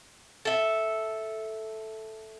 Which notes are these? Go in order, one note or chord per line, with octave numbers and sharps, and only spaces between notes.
A4 E5